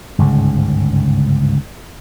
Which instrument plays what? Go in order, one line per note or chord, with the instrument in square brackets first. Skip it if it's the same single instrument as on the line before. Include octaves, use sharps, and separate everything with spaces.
[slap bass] G1 C#2 G#2 C#3